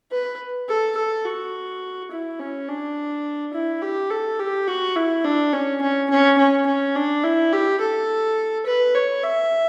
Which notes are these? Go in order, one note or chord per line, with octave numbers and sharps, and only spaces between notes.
B4
A4
A4
F#4
E4
C#4
D4
E4
G4
A4
G4
F#4
E4
D4
C#4
C#4
C#4
C#4
C#4
D4
E4
G4
A4
B4
C#5
E5